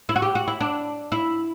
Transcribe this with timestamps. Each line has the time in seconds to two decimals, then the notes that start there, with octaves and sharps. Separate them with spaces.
0.09 E4
0.16 F#4
0.22 G4
0.35 F#4
0.48 E4
0.61 D4
1.12 E4